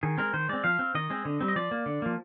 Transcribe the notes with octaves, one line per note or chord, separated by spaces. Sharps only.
D#3 G#4
G#3 C4 A#4
D#3 C5
G#3 C4 D5
F3 F5
C4
D#3 D#5
G#3 C4
D3
G3 C4
D#5
F3 D5
A#3
D3
F3 A#3